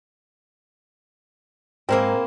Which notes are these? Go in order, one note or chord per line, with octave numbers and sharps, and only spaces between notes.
G#2 A#3 C4 E4 A#4 G5